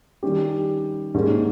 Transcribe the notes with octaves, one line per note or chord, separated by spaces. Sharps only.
D#3 G3 C#4 G4
G#2 G3 A#3 C#4